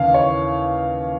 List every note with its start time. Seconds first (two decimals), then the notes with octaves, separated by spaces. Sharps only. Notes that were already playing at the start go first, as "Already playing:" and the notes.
Already playing: D#2 C#3 E3 F5
0.14 C#5